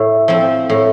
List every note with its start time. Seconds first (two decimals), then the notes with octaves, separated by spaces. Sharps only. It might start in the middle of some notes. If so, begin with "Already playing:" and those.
Already playing: A2
0.28 F3 C4
0.70 A2